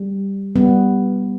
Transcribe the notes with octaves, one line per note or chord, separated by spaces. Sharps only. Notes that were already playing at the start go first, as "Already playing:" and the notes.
Already playing: G3
G3 B3